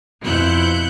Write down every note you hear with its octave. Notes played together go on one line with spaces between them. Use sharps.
F2 B2 E4 F#6 G6 C#7